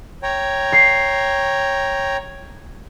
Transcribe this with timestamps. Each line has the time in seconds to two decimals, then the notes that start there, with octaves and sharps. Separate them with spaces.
0.23 C#5 G5 A#5
0.73 C7